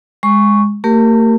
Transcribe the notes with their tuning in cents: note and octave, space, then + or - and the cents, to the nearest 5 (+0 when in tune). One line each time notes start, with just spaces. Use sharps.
G#3 -10 C#6 +0
A3 +45 G4 +0 A#4 +0